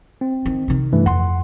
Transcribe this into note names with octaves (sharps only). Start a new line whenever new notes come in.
C4
D#3
C3 D#3
G2 E3 A3
F2 F#5 C6